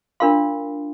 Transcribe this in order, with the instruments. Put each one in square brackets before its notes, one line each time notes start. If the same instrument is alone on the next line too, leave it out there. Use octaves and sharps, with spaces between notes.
[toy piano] D4 F4 A#4 F5 C6